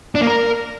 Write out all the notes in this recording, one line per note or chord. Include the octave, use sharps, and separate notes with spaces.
D4
A#3
A#4